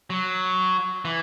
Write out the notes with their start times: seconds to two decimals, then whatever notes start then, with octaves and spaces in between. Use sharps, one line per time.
0.10 F#3
1.05 E3